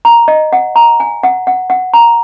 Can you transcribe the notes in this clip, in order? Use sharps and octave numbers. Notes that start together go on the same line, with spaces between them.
A#5
D#5
F#5
A#5
G#5
F#5
F#5
F#5
A#5